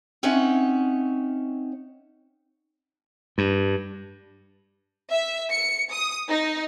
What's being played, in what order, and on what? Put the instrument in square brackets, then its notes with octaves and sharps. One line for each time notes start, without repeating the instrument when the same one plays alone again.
[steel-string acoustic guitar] C4 C#4 D#4 C#5 E5 F#5
[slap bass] G2
[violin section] E5
C#7
D#6
D#4